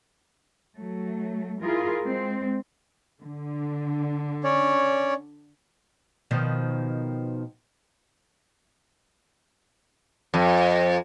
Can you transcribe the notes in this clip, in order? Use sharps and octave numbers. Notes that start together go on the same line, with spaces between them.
F#3 A3
E4 F4 G#4 A#4
G#3 C4
D3
C#4 C#5 D5
B2 D#3 F3
F2